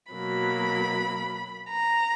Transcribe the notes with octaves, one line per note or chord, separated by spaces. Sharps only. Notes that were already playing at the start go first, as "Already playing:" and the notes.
B2 F#3 A#3 B5
A#5